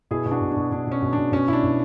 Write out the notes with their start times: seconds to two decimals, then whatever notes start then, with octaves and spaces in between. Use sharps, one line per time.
0.11 B2 E4 G#4
0.26 B2
0.31 D4 F#4
0.41 B2
0.52 B2 D4
0.71 B2 D4
0.87 B2 C#4
1.02 B2
1.13 B2 D4
1.32 B2 C#4
1.48 B2 D4 E4
1.63 B2